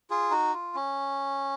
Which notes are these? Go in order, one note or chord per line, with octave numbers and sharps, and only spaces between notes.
F4 G#4
D#4 F#4
F4
C#4